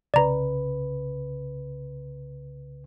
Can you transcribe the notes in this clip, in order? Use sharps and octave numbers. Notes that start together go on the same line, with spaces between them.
C2 C#3 B4 D5 A#5